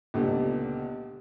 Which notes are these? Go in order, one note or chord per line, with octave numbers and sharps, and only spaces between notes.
C#2 A#2 D3 G3 B3